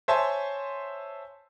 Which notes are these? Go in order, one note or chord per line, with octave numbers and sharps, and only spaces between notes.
C5 C#5 E5 G#5 A5 C6